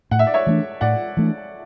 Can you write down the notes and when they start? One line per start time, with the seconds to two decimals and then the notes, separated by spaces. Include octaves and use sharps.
0.11 A2 F#5
0.19 E5
0.27 D5
0.34 C#5 E5
0.47 E3 A3 D4
0.81 A2 D5 F#5
1.17 E3 A3 D4